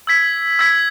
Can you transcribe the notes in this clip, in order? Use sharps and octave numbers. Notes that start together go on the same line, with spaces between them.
E6 G#6 B6
E6 G#6 B6